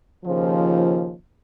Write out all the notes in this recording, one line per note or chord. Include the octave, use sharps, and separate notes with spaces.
D#2 C#3 F3